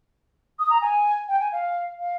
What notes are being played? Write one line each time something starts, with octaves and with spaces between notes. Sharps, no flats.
D#6
A#5
G#5
G5
G#5
F5
F5